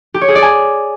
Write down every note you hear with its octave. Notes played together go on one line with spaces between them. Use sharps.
G4
C#5
G#4
D5
G#5